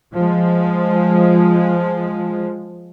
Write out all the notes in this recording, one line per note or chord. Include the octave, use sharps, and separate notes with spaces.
F3 G#3